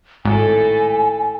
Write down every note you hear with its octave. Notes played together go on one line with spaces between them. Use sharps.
G#1 A2 A4 G#5